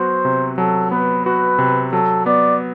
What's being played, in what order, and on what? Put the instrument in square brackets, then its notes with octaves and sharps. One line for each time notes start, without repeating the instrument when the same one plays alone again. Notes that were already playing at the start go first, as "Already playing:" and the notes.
Already playing: [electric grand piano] F#3 B3 F#4 [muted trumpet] C5
[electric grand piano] C3
[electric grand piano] F#3 [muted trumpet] A4
[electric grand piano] B3 [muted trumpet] B4
[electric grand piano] F#4 [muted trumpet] B4
[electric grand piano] C3
[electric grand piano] F#3 [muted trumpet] A4
[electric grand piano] B3 [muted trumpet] D5